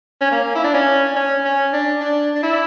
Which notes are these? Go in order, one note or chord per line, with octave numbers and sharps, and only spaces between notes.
C#4
A#3
E4
D4
C#4
C#4
C#4
D4
D4
D4
E4